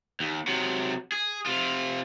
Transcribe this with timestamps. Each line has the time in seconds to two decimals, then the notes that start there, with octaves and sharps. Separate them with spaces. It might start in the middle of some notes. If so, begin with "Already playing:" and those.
0.20 D#2
0.47 C3 F#3
1.12 G#4
1.46 C3 F4